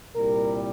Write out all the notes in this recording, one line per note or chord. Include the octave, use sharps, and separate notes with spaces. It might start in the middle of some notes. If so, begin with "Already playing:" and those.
C2 A#2 G3 A#4